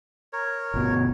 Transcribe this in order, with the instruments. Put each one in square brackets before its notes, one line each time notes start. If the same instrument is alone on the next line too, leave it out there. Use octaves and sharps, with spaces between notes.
[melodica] A#4 C#5
[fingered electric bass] G1 B2